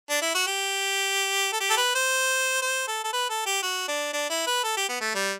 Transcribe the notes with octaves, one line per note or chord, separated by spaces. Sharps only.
D4
E4
F#4
G4
A4
G4
A4
B4
C5
C5
A4
A4
B4
A4
G4
F#4
D4
D4
E4
B4
A4
G4
B3
A3
G3